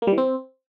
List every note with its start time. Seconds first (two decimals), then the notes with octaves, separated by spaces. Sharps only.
0.02 A#3
0.07 G3
0.12 E3
0.18 C4